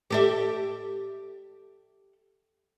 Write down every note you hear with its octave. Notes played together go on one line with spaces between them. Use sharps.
G4 A4 E5